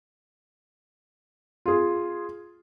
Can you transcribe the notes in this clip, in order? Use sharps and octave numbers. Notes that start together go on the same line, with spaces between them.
F4 G#4